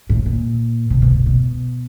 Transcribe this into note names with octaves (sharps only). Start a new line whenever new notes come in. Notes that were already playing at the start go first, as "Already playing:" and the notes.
A2
A#2
C3
B2
A#2
B2